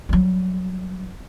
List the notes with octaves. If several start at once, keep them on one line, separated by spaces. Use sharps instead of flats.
F#3 G3